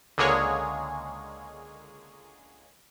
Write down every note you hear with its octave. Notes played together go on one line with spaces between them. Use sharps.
C#2 D3 G#3 A#3 G#4 C#5